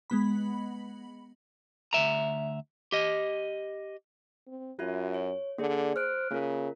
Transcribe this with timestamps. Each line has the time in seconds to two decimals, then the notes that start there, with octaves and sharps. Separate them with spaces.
0.10 G#3 B3 B5
1.93 D2 G2 E5 A#5
2.92 G4 D#5
4.47 C4
4.79 F#2 F4 F#4 E5
5.14 C#5
5.58 D3 A#3 G#4 D5
5.96 C5 F6 F#6 D7
6.31 C#3 A#3 F4 A#4